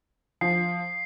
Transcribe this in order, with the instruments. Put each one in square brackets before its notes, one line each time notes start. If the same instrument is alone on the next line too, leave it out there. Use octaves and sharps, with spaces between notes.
[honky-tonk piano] F3 [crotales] C7